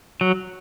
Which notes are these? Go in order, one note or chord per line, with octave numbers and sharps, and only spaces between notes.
F#3